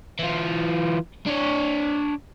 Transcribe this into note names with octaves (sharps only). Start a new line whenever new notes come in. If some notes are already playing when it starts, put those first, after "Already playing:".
E3 F4
D4 C#5